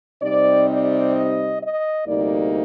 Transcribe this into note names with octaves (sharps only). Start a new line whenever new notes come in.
C3 G3 C4 D#4 D5
D5
D#5
D#5
D2 C3 G3 A#3 D#4 D5